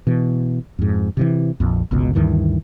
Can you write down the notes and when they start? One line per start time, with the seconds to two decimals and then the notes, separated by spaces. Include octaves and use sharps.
0.07 B2 E3
0.79 F2 G#2
1.17 C3 D#3 E3
1.60 A#1 F2
1.91 G1 C#2 B2
2.15 D2 G2 D#3 E3